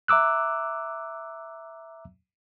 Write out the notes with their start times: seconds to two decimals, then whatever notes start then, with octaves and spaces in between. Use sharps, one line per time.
0.08 E5 A#5 D6 E6 F#6